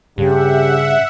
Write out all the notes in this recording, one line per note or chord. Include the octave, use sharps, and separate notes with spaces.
G2 C#3 G4 E5 F#5